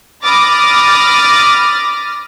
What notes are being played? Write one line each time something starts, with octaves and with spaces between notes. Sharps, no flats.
B5 D6 D#6 F6 A6 A#6